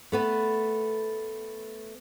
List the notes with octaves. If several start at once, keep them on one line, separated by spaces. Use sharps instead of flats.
A3 B3 B4